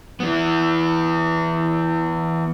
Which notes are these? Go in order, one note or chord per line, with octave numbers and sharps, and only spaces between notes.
E3 B3